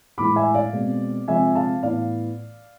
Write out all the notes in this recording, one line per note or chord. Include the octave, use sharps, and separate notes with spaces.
A2 E3 G#3 B5 D6
E5 G#5
D5 F5
B2 G#3 C4
C3 F3 G#3 C4 E5 G#5
F5 A5
A2 E3 B3 D5 F5